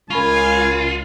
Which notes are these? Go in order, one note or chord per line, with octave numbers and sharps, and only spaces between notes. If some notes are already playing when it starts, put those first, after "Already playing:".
C#2 F4 A#4 G#5 B5 C#6